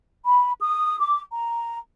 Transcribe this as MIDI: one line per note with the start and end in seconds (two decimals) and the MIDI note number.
0.24 0.51 83
0.60 0.98 87
1.00 1.20 86
1.32 1.78 82